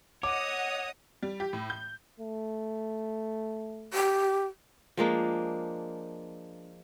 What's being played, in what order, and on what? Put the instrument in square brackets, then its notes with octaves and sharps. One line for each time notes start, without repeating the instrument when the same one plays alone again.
[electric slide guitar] C#5 [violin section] D#5 F#5 D#6 [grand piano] D6
[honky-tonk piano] G3
G4
A2
G6
[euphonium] A3
[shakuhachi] G4
[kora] F3 G#3 A#3 D4